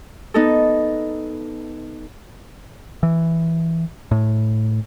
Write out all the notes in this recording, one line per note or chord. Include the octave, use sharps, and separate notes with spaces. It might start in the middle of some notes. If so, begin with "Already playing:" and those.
B3 D#4 A4
E3
A2